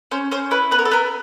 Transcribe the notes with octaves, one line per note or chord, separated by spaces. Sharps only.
C#4 C5
C#4 C5
E4 B4
B3 B4
A#4
A4
B3 A#4